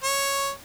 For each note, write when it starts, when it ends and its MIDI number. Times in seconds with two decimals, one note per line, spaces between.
0.04 0.50 73